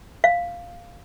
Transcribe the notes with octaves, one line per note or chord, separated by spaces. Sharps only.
F5